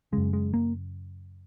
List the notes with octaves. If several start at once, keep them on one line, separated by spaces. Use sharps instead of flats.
F#2 C#3 G#3
G#3
A#3